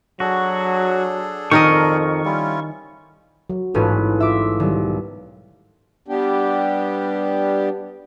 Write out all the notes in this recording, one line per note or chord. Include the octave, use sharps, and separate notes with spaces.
F#3 D4 F#4 G#4 A4
F2 D#3 A#4 D#5 C#6
G3 C#4 E4 F4
F#3
A1 G#2 C#4 F4 A4 B4
F4 E5 D6 E6
B1 D#3 G3
G3 B3 D4 G4